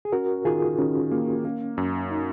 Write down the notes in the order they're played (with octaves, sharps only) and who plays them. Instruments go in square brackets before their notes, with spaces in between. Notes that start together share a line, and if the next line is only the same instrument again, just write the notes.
[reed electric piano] G#4
[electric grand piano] C#4 [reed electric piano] F#4 A#4
[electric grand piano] D#3 [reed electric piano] F4 G#4
[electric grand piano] D#3 [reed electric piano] C#4
[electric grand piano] A#3
A#3
F#2
[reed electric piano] D#4